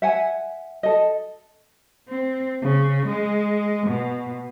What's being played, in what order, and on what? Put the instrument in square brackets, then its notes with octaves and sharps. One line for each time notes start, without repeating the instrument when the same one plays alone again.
[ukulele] E5 F#5 G#5
A4 D#5
[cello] C4
C#3
G#3
B2